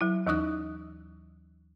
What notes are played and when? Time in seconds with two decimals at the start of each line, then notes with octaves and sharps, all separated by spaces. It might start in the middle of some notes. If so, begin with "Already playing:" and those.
0.01 F#3 E4
0.27 D#2 E3 D#4 D#6 F#6